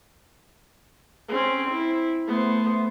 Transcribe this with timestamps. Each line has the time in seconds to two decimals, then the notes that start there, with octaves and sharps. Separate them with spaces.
1.29 C4 C#4
1.71 E4
2.28 A3 B3 C5